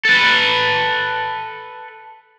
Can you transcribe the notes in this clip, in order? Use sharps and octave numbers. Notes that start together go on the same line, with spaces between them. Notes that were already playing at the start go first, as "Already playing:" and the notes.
A4 B4